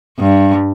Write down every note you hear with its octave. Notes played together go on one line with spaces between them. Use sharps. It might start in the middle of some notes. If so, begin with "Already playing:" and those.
G2